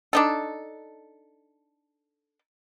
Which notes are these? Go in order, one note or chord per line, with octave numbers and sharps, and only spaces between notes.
D4 D#4 A4